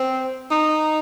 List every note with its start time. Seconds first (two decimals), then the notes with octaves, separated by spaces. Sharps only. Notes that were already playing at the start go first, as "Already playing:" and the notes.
Already playing: C4
0.51 D#4